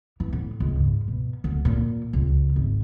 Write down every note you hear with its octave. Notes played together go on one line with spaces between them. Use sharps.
E3
A2
C#2
G#2
B2
D2
A#2
C#2
G#1